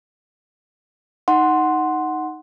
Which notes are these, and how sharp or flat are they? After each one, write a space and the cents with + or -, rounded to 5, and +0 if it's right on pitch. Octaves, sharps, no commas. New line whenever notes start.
D#4 +0 F#5 +0 C6 +0